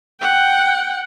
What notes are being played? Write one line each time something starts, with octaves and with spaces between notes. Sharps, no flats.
F#5 G5